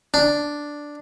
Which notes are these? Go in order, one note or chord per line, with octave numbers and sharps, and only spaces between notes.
D4